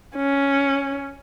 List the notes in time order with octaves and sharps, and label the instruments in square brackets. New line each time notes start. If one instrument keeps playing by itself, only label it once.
[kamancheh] C#4